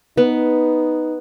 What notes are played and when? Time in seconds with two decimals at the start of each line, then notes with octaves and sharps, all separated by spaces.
0.17 B3 D#4